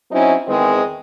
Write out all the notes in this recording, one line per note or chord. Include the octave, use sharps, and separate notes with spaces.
F#3 C4 C#4 D#4 E4
E2 D#3 G#3 C4